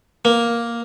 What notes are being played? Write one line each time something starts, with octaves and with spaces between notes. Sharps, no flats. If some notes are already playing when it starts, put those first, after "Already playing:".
A#3